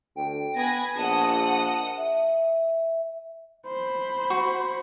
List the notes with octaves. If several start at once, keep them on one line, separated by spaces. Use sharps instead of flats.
D2 G5
B3 B4 G#5 A#6
A#1 D#5 F#5 A5 D#6
E5
C5 B5
F#4